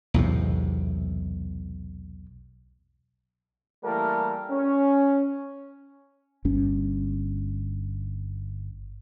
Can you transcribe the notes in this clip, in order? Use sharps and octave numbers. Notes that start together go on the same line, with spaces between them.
B1 E2 A2 C3
E3 G3 A3 A#3 A4 A#4
C#4
G1 G2 C#4